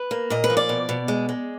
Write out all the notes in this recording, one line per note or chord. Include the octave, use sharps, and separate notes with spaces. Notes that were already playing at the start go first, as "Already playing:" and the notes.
Already playing: B4
A#3
A#2 D#5
B4
F3
D5
B2
B2
G#3
G#3